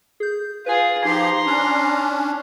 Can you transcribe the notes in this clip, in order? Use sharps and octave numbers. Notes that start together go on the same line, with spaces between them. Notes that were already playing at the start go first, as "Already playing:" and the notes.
G#4 G6
F4 G#4 B4 G#5
F3 D#4 G4 A#5 C6
C#4 D4